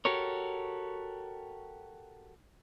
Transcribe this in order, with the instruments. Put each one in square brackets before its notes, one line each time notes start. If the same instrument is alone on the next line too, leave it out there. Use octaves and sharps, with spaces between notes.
[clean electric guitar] F#4 G4 A4 A#4 C#5